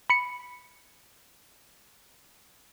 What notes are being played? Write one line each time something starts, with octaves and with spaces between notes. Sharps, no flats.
B5 C#7